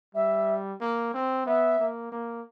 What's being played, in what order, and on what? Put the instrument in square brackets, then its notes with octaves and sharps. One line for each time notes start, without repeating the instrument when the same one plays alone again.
[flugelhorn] G3 [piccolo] E5
[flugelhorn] A#3
C4
[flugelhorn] B3 [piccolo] E5
[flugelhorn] A#3
A#3